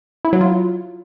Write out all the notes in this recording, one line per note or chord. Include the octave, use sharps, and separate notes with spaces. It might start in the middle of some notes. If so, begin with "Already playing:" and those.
E4
F#3
F4